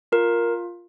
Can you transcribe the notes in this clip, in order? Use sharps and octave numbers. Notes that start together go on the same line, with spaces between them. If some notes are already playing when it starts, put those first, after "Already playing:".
F4 A#4